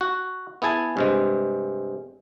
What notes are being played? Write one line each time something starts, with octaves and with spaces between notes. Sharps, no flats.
F#4
B3 E4 G#4 G#5 A5
G2 C3 G#3